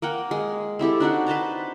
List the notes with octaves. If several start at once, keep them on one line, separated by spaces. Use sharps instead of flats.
A#3 A#4 F#5 G5
G#3
C4 E4 G4 A4
D4 D#4 F#4 F#5
B4 C5 A5 A#5